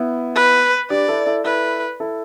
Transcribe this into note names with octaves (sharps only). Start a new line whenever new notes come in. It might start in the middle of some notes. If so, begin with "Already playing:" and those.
Already playing: B3 E4
B4
D4 G4 D5
E4 A4
E4 A4
E4 A4 B4
E4 A4